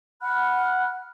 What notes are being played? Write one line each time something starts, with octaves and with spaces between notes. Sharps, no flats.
F#5 B5 F6 F#6